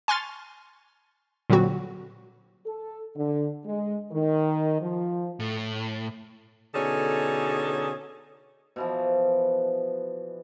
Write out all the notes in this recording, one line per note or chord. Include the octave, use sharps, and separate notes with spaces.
G#5 C6 C#6 F6 A6
A#2 D3 F#3 G3 C4 F#4
A4
D3
G#3
D#3
F3
A2
B2 D3 C#4 D#4 G#4 A4
B2 E3 F3